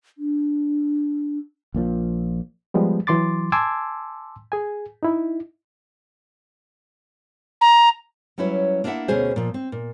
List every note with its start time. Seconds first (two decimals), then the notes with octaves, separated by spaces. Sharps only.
0.18 D4
1.74 A#1 A#2 E3 F3
2.74 F3 G3 G#3 B3
3.07 E3 F#3 C6 D6 A6
3.52 G#5 A5 C6 D6 E6 G#6
4.52 G#4 G#5
5.03 D#4 E4
7.61 A#5
8.38 F#3 G3 C#4 E4 B4 C#5
8.84 A#3 D4 E4 C#5 E5 F#5
9.08 D2 B2 C#4 G#4 C5
9.36 A#2 F3
9.54 C4
9.72 A#2